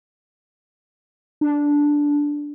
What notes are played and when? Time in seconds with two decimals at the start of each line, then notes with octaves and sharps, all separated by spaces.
1.41 D4